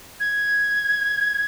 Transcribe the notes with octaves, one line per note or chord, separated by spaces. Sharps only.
G#6